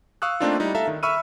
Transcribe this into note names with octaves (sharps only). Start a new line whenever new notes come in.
F5 C#6 D#6 E6 F#6
A3 A#3 C4 D4 D#4 F4
G3 D#4 E4
A4 E5 F5 A#5
D#3
E5 B5 C#6 E6 F6 D#7